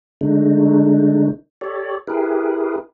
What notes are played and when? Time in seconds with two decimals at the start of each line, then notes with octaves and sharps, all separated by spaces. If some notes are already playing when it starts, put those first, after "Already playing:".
0.21 D3 G#3 A3 D4 D#4
1.61 G4 A4 C#5 D5
2.07 E4 G4 G#4 A#4 B4